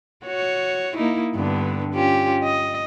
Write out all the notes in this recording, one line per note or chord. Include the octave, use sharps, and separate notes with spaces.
F#4 C#5
A#3 D#4 E4
G2 D3 B3
C#4 F4 G4
D#5